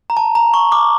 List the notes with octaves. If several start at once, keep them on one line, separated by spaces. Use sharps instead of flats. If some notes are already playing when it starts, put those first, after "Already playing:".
A#5
A5
A#5
C#6
D6